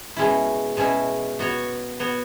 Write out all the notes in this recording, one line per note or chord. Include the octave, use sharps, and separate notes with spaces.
B2 G#3 C#4 E4
B2 G#3 C#4 E4
B3 F#4 C#5
B3 F#4 C#5